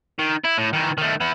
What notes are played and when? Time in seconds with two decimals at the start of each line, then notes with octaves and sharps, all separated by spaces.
0.19 D#3
0.45 E4
0.58 A2
0.73 D#3 E3
0.98 D#3 A3
1.20 B3 E4